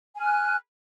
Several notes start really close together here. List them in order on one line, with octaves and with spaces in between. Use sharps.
G#5 F6 F#6